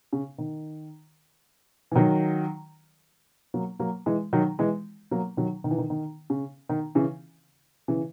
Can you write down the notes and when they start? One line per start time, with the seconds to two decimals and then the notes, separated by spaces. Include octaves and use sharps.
0.13 C#3
0.38 D#3
1.92 E3
1.96 D#3 F#3
3.54 F#3 A#3
3.80 F#3 A#3
4.06 E3 G#3
4.33 D#3 F#3
4.59 E3 G#3
5.11 F#3 A#3
5.37 D#3 F#3
5.64 D#3
5.71 E3
5.78 D#3
5.90 D#3
6.30 C#3
6.69 D#3
6.95 C#3 E3
7.88 C#3 E3